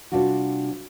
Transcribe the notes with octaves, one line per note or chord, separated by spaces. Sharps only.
C3 D#3 G3 D4 F4 F#4